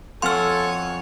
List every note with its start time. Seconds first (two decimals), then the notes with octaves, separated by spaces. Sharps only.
0.22 F2 A4 C#5 F#5 G#5 C6 F6